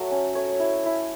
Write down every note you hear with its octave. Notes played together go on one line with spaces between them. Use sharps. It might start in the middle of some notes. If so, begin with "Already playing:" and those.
Already playing: F#3 A3
C#4
A3 C#5
E4
E4